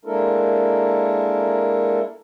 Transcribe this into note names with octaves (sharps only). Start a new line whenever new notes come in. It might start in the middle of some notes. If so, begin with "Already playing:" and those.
G#3 A#3 D4 E4 A4 A#4